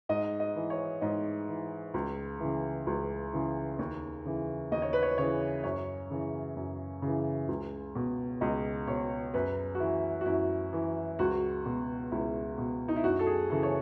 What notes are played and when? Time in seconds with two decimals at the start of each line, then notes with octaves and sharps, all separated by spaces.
0.09 G#2 D#5
0.40 D#5
0.55 E3
0.70 C#5
1.01 G#2 D#5
1.48 E3
1.94 C#2
2.40 C#3 E3
2.87 C#2
3.33 C#3 E3
3.79 D#2
4.25 C#3 E3
4.72 D#2 D#5
4.82 C#5
4.93 B4
5.03 C#5
5.18 C#3 E3 C#5
5.64 F#2 C#5
6.10 C#3 E3
6.56 F#2
7.02 C#3
7.07 E3
7.48 C#2
7.95 B2
8.41 C#2 D#5
8.87 B2 C#5
9.34 F#2 B4
9.75 F#4
9.80 E3 E4
10.21 F#4
10.26 F#2 E4
10.73 E3
11.19 C#2 F#4
11.66 B2
12.11 C#2 E4
12.58 B2
12.88 D#4
12.96 E4
13.04 F#2 F#4
13.19 A4
13.27 G#4
13.50 C#3 E3 A4
13.63 C#5